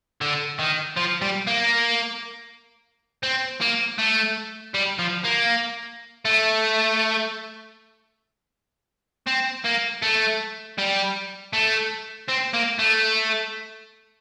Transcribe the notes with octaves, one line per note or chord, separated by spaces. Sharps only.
D3
D#3
F3
G3
A#3
C4
A#3
A3
G3
F3
A#3
A3
C4
A#3
A3
G3
A3
C4
A#3
A3